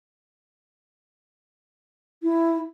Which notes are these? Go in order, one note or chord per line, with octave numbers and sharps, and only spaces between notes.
E4